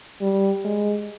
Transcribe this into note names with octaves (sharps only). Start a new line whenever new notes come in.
G3
G#3